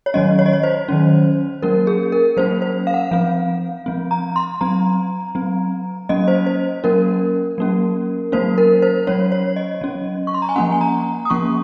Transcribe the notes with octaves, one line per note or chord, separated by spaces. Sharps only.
C#5
D#3 F#3 C#4 D#5
C#5
D#5
C#5
C5
D#3 F#3 C#4
F#3 A#3 C#4 A#4
G#4
A#4
F#3 A#3 C#4 C5
C5
F5
F#5
F5
F3 C4 F5
F3 C4
A#5
C6
F#3 C4 A#5
F#3 C4
F#3 A#3 C#4 D#5
C5
C5
F#3 A#3 C#4 A#4
F#3 A#3 C#4
F#3 A#3 C#4 C5
A#4
C5
F#3 C#4 C#5
C#5
D#5
F#3 C#4
C#6
C6
A#5
G#5
F3 A#3 C#4 F#5
G#5
A#5
D#6
F3 A#3 C#4 C#6